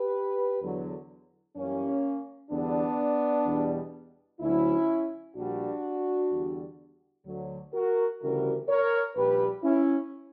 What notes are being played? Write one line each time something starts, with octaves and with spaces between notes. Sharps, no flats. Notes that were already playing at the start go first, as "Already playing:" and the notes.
Already playing: G4 B4
E2 D3 F#3
F#2 E3 G3 A#3 C#4
E2 D3 G3 B3 D4
E2 B2 G3
D2 D3 F#3 C#4 E4
A#1 A#2 G3 D4 F#4
E2 D3 G3
D2 D3 F#3
F#4 A#4
D2 C#3 E3 G3 F#4 A#4
A#4 C#5
A#1 A#2 G3 G4 B4
C#4 E4